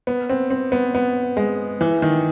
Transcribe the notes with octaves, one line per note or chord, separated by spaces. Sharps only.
B3
C4
C4
B3
B3
G#3
E3
D#3